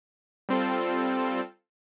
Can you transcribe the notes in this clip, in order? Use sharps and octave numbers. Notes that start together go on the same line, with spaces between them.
G3 C4 F4 A4